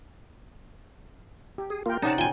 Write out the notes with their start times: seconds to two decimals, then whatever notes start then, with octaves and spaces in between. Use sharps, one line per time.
1.58 G4
1.70 G#4
1.86 A#3 F4 A#4 G5
2.02 C3 C#4 D#4 D5 F#5 A5
2.18 F4 G5 G#5